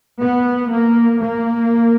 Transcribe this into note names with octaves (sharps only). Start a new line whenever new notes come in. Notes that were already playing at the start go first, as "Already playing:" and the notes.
B3
A#3
A#3